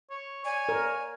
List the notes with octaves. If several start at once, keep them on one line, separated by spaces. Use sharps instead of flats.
C#5
C#5 D5 G#5
A#4